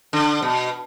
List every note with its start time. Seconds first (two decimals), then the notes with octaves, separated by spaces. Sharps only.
0.13 D3
0.42 B2